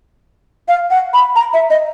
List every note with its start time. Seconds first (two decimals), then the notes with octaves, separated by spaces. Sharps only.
0.68 F5
0.91 F#5
1.14 B5
1.36 A#5
1.54 E5
1.70 D#5